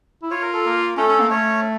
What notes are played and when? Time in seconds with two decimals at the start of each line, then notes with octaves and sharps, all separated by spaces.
0.23 E4
0.31 F4 C#5
0.42 A#4
0.53 A4
0.65 A#3 A#4
0.97 A3 C#4 A4
1.08 C#4
1.20 A#3
1.31 A3 C#4 C#5